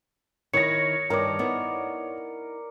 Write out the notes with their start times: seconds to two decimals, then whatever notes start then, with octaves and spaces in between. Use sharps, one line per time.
0.54 D#3 E4 C#5 A#6 C#7
1.10 G2 D#3 D#4 A#4 D5
1.39 B3 D#4 E4